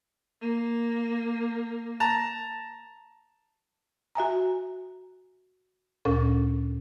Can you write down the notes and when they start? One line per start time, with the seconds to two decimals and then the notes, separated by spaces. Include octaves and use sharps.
0.41 A#3
2.00 A5 A#5
4.15 F#4 E5 G#5 A#5
6.05 D2 A#2 C#4 A4 A#4